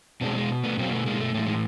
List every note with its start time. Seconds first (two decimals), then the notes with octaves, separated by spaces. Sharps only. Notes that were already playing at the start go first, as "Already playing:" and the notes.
0.21 B2 G#3 C4 D4
0.36 G#3
0.64 A3 B3
0.78 B2 F#3 A#3 C4
0.92 A3 B3
1.06 G#3 A#3
1.20 A3
1.34 A2 E3 G#3 A3
1.45 G#3